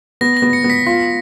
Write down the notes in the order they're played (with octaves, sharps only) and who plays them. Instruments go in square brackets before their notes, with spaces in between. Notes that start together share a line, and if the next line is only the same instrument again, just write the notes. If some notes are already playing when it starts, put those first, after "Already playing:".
[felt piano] B3 [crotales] A#6
[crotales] A#6
[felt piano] B3
[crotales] C#7
[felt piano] B3
[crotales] B6
[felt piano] F4